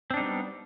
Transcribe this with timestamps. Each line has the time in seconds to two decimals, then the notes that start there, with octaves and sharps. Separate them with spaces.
0.11 C4
0.14 D4
0.17 D#4
0.20 G3
0.23 B3